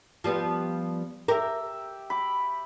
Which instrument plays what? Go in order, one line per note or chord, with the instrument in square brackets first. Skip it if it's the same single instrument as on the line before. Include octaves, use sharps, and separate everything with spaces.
[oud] F3 G3 B3
[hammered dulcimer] G4 E5 [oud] A#4
[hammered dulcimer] B5 D6